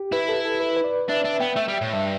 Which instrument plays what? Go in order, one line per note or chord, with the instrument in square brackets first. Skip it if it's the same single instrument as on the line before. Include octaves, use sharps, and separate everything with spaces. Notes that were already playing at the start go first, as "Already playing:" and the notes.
Already playing: [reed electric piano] G4
[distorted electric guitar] E4 [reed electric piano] B4
[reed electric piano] A4
A4
B4
B4
D5
[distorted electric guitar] D4 [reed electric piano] E5
[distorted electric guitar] D4 [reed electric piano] E5
[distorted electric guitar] B3 [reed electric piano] G5
[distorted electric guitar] A3 [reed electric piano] E5
[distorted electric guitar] G3
[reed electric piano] G5
[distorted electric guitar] A2
[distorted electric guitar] G2 [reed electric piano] E5